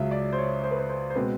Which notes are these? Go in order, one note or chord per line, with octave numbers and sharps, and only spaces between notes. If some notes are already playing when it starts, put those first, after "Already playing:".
Already playing: C#2 C#3 F#3 E5
D5
C5
C#5
C5
B4
C5
C5
C5
B2 G#3 C4 B4